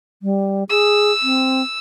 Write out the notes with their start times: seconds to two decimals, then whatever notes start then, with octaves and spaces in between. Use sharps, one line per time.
0.23 G3
0.70 G#4 E6
1.23 C4